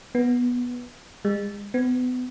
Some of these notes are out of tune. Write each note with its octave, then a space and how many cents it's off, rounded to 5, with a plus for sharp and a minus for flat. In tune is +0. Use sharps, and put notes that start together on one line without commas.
B3 -10
G#3 -40
B3 +30